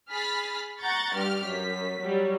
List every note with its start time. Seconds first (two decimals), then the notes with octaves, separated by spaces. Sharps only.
0.11 G#4 B5 F6 A6 B6
0.80 F#5 A#5 C#6 G6 A6
1.15 G2 G3 G4 F6
1.45 F#2 B6
2.00 F#3 G3